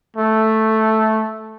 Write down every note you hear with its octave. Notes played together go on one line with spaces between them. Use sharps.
A3